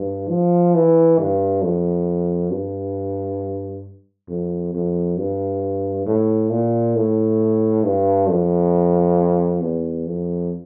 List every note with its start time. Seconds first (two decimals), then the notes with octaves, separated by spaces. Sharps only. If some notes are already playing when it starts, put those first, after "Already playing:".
Already playing: G2
0.29 F3
0.75 E3
1.19 G2
1.62 F2
2.52 G2
4.29 F2
4.74 F2
5.18 G2
6.07 A2
6.51 A#2
6.96 A2
7.84 G2
8.29 F2
9.61 E2
10.07 F2